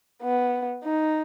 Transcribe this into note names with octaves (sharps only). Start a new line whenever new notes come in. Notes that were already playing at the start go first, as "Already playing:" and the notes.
B3
D#4